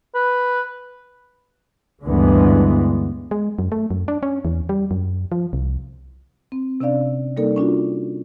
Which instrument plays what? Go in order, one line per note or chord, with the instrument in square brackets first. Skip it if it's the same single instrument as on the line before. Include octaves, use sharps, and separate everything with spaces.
[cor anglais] B4
[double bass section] D2 G2 D3 E3 G#3 B3
[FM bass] G#3
F#2
A3
F#2
D4
C#4
E2
G3
F#2
F3
C2
[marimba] C4
C3 C#4 D4 D5 F5
G3 A#3 D#4 A4 A#4 D5
C#4 D4 F4 F#4